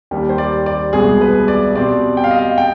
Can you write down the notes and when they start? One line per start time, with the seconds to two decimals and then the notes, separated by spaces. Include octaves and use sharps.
0.11 D#2 D#3 G3
0.29 C5
0.38 D5
0.66 D5
0.93 C2 B2 G#3 G#4
1.21 B4
1.48 D5
1.75 B2 G3 C4 D5
2.17 G5
2.24 F5
2.31 D#5
2.39 F5
2.58 G5